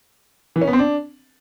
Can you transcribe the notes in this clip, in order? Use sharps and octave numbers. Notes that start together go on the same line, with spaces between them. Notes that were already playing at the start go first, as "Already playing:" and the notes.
E3
C#4
B3
C4
D4